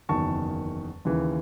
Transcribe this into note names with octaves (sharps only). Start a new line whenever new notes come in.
F#1 E2 D#3 F#3 A5 C#6
D#2 C#3 E3